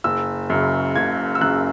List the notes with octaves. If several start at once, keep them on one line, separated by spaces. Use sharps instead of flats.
F#1 E6
F#2 C#3
F#1 G#6
E6
F#2 C#3 F#6